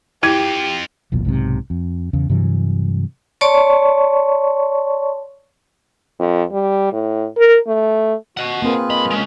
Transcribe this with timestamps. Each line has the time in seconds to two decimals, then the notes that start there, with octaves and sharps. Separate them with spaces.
0.23 F2 E4 F4 G4 G#6
1.12 F1 B1 E2 A#2
1.25 B1 G#2 C3
1.70 F2
2.13 E2 C#3
2.30 G2 C3 E3 F#3
3.41 C#5 D5 A5 C6 C#6
6.19 F2
6.52 G3
6.92 A2
7.38 A#4
7.68 A3
8.37 F#4 D#5 F#5
8.62 A#3 C4 F4 G#4 A#4 B4
8.90 G2 D#5 B5
9.11 G#3 C#4